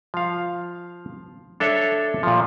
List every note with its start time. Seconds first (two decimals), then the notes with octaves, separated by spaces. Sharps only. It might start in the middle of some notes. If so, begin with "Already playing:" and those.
0.14 F3 F5
1.60 D4 A4 C#5 E5
2.23 A#2 F3